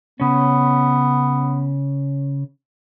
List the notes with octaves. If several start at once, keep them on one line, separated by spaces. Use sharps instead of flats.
C#3 B3 C#4